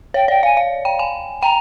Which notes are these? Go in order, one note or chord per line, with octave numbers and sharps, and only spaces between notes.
C#5 G5
D5 G5
F5 G#5
F5
G5
G#5
G5 A#5